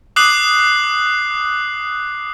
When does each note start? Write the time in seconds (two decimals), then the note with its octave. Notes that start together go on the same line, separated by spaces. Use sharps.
0.16 D6 D#6 F#6 C7 F#7